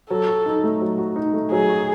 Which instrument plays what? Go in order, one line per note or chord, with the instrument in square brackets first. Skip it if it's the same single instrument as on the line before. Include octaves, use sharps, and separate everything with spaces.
[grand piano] F#3 [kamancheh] A4
[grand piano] F#4
D#4
A3
F#3
F#4
D#4
A3
[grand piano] F#3 [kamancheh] G#4
[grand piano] F#4